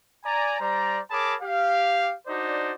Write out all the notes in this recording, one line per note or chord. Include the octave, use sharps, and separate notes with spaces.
D5 G#5 A#5
G3 C5 D5 A#5
G#4 A#4 C#5 A5 B5 D6
G4 F5
D4 D#4 F#4 C5 D5